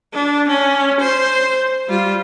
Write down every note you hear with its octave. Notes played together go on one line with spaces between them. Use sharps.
D4
C#4
C5
G3 F4